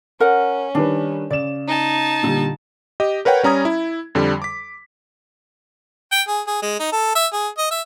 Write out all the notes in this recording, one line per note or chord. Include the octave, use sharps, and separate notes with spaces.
C#4 A#4 F#5
D#3 G3 D4 B4
C#3 D5 E7
D#4 A5
A#2 D3 G3
G4 D#5
A#4 B4 C#5 F#5 G5
G3 C#4 A#5 D#6 G#6
E4
F2 D3 G3
D6 B6
G5
G#4
G#4
G#3
D#4
A4
E5
G#4
D#5
E5